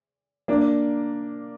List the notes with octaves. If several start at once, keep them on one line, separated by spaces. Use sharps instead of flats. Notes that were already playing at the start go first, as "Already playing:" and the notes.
A#3 D4